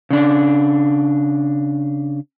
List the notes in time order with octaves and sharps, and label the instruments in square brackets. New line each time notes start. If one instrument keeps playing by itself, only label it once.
[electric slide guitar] C#3 D4